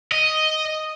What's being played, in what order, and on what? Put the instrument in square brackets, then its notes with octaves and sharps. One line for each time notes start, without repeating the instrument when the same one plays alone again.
[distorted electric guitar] D#5